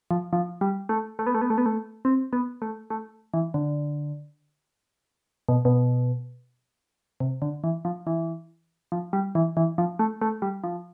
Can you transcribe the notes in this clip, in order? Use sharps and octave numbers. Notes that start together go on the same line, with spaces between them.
F3
F3
G3
A3
A3
B3
A3
B3
A3
B3
A3
C4
B3
A3
A3
E3
D3
B2
B2
C3
D3
E3
F3
E3
F3
G3
E3
E3
F3
A3
A3
G3
F3